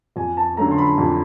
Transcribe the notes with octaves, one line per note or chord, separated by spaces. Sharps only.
F2 G#5
A5
D3 F#3 A3 A#5
C6
B5
F2